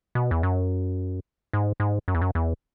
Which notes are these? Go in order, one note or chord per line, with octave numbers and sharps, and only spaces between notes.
B2
E2
F#2
G#2
G#2
F#2
E2
F#2
E2